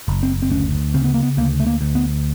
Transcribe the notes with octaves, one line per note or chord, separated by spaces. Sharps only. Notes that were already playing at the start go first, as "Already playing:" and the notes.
F#1
C4
C4
D2 C#4
C#3 C4
B3
A#3
B3
D2 A#3
A3
A#3
D2
B3